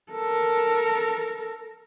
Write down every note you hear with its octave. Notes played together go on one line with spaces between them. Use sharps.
A4 A#4